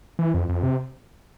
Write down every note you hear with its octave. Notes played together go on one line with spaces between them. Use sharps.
E3
F2
F2
C3